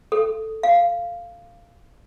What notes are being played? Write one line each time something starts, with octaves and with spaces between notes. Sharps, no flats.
A4
F5